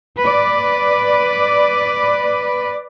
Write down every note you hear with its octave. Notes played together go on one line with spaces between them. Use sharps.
B4 D5